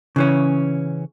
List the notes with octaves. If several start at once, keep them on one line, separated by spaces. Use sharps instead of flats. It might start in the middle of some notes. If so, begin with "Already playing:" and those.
C#3 E3 C#4